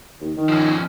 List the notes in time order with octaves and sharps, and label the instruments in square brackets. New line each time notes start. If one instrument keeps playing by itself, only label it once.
[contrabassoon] D#2
D#3
[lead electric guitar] F3 C#4